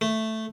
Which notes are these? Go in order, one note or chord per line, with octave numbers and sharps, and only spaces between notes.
A3